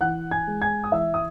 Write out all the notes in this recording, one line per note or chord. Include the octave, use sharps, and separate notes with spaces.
E3 F#5 F#6
G#5 G#6
G#3
G#5 G#6
D#6
E3 E5 E6
D#6